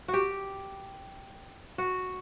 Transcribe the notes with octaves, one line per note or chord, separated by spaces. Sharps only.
F#4
G4
F#4